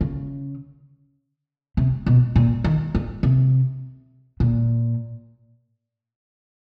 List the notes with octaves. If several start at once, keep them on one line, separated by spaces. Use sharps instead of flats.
C#3
C3
B2
A#2
D#3
D3
C3
A#2